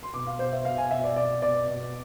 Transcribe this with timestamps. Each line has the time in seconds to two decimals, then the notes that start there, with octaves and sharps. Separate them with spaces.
0.03 C6
0.13 B2 D6
0.27 F5
0.39 B2 C5
0.53 E5
0.65 B2 F5
0.78 G#5
0.91 B2 E5
1.04 D5
1.16 B2 D5
1.42 B2 D5
1.67 B2